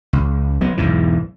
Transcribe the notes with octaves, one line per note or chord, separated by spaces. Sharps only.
C#2
F#3 B3
B1 E2 G#2 E3